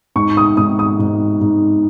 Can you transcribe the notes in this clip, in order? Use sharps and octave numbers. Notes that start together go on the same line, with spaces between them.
G#2 C#6
D#6
G#2 D#6
D#6
G#2
G#2